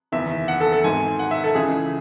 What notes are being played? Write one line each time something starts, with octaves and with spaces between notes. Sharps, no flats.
F#1 E2 D#3 E5
F#5
A4
A4
G#1 G#2 D#3 G#5
F#5
E5
A4
C#2 C#3 E3 G#4